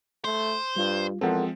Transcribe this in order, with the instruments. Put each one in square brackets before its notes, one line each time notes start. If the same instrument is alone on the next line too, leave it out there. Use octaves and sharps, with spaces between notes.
[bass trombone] A3 [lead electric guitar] C5
[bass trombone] G2 [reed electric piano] G3 F4
[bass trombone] E2 [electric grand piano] F3 G#3 C4 [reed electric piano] A4 A#4 F#5